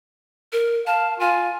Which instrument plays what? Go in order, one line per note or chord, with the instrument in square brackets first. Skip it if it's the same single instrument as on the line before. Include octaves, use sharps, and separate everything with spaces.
[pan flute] A#4
[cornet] F5 [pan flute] A5
[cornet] F4 [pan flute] G#5